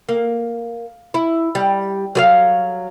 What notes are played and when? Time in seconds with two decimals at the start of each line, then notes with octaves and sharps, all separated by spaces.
0.09 A#3
1.14 E4
1.55 G3
2.15 F#3 G#4 F5